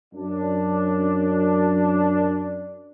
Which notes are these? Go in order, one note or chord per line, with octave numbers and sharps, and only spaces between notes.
F#2 D4